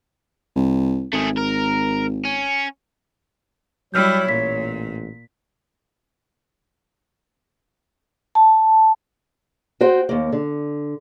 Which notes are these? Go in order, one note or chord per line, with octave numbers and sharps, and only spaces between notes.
C2
G#1 A3 G#4
A#4
C#4
F#3 G3 E4 C#5 E6 F6 G6
A1 A#2 B6
A5
F#4 C5 G5
D#2 A#3
D3